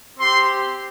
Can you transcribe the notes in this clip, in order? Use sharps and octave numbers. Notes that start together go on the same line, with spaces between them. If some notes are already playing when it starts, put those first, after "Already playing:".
C4 G4 C6